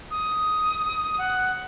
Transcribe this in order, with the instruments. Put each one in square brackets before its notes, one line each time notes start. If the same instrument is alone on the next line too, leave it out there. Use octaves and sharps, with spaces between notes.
[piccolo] D#6
F#5